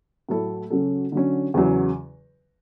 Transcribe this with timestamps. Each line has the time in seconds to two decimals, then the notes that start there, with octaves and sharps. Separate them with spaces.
0.29 A2 F#3 A3 E4 A4
0.70 C#3 F#3 C#4 F#4 A4
1.12 D3 F#3 C#4
1.54 E2 C#3 F#3